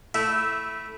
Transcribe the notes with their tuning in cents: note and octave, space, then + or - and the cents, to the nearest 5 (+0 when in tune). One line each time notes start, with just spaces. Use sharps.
A3 +0 E4 -10